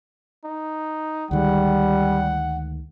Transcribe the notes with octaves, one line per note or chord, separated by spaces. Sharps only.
D#4
D2 D#3 G3 G#3 F#5